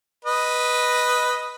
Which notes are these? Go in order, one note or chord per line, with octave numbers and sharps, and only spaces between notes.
B4 D#5